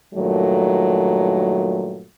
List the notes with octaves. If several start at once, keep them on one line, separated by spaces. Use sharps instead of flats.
G2 A#2 D#3 F#3 A3